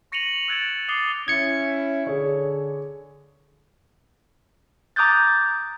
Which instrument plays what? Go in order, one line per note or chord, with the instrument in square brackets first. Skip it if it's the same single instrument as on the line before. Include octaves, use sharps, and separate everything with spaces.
[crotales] C#6 A#6 C#7 D#7 F7 F#7
E6 F#6 G#6 A6 D7 E7
D6 D#6 A6 C7 G7
[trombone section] C#4 E4 [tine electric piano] G#6 C#7
[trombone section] D3 [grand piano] G#4 C#5
[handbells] A#5 D6 D#6 F#6 G6 A6